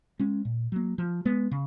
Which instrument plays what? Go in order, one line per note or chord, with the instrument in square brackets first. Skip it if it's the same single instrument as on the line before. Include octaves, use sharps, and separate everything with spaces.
[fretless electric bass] G#3 C#4
A#2
F#3 A#3
F3
G#3 B3
C#3